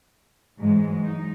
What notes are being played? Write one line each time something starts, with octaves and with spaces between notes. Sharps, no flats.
G#2 E3 F#3 G#3
D#4